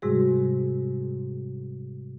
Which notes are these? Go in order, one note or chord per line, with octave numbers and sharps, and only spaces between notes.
G#2 C3 G3 G#3 F#4 G#4